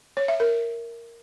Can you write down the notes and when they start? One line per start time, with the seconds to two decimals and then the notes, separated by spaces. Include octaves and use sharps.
0.17 C#5
0.28 E5
0.40 A#4